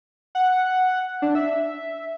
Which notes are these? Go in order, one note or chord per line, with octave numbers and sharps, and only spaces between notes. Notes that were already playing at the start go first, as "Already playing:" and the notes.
F#5
D4
E5